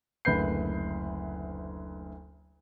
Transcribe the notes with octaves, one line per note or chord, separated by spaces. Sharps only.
F#1 D2 B4 G6 C7